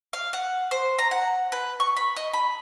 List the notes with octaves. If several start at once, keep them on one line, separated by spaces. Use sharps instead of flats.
F5
F#5
C5
A#5
F#5
B4
C#6
B5
D#5
B5